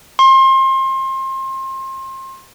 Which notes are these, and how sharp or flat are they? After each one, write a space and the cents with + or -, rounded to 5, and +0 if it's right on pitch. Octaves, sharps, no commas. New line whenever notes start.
C6 +30